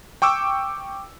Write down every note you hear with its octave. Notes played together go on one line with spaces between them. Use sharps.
G5 C#6 D6 E6